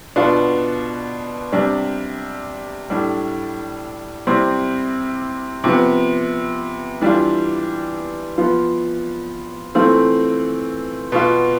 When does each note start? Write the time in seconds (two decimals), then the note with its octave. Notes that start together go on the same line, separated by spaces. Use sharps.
0.16 B2 B3 D4 F4
1.52 C3 G3 D4
2.90 A2 G3 D4
4.27 C3 G3 C4 E4
5.64 C3 F3 B3
7.02 E3 G3 D4 F4
8.38 F3 B3 F4
9.75 E3 A3 C4 F4
11.12 B2 B3 F4